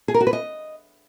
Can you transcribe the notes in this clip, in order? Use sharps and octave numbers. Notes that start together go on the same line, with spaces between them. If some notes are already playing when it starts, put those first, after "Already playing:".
G#4
A#4
F#4
B4
D#5